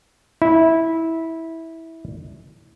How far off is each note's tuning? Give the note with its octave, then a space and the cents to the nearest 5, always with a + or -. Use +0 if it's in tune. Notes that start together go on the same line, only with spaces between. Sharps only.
E4 -15